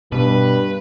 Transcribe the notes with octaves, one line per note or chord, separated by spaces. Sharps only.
G2 B2 B4